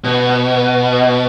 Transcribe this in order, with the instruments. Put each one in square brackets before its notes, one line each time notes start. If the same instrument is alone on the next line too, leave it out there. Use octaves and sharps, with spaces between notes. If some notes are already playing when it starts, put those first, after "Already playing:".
[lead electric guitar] B2